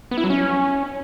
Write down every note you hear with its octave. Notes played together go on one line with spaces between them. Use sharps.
B3
E4
F#3
C#4